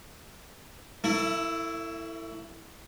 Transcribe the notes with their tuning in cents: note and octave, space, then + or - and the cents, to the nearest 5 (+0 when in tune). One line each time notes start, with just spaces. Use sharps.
A3 +35 E4 +0